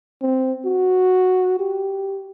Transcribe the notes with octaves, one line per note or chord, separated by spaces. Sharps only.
C4
F#4
G4